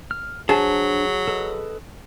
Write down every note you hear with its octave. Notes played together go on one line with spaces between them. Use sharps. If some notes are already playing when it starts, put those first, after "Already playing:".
F6
F#3 D4 G#4 C5 A5
A4 B4 D#5